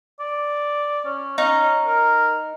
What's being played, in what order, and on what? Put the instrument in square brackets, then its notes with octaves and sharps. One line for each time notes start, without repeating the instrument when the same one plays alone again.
[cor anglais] D5
C#4
[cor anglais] C#4 [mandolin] D#4
[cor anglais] A#4